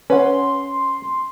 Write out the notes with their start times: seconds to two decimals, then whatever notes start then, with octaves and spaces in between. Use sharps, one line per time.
0.10 C#4 B4 F#5 C6